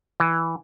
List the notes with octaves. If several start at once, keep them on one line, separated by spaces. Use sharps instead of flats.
E3